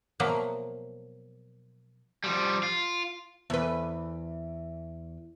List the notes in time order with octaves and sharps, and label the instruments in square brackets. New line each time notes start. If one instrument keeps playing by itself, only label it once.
[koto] B2 F3 F#3 A#3 E4
[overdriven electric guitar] F3 G3
F4
[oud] E2 B4